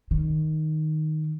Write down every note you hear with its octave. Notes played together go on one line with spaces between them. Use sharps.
D#3